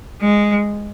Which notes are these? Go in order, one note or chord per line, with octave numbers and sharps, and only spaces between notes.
G#3